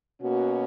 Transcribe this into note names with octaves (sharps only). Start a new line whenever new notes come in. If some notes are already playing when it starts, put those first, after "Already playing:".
B2 A#3 C#4 F#4